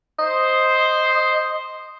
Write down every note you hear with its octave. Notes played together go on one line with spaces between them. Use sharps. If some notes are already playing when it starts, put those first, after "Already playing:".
C5 D#5